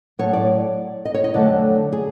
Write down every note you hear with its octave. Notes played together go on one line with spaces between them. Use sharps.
A2 F#3 A3 C#5
D5
D#5
C#5
D#5
F2 D3 F#3 A3 D5
G#4